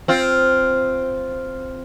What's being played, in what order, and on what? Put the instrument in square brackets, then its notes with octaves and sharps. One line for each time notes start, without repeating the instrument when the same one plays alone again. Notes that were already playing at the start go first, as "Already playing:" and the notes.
[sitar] C4 F4